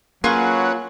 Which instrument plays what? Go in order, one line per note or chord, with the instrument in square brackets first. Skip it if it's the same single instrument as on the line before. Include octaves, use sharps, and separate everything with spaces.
[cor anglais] F#3 [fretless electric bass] A#3 [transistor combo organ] C#4 B4 F#5 [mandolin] F4 G#4